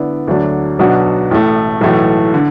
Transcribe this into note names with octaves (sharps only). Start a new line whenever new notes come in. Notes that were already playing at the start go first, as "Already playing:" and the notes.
Already playing: D3 B3 E4 D5
D2 D3 F#3 D4
B1 B2 F#3 D4 F#4
A1 A2 A3
B1 A2 E3 A3 F#4
D3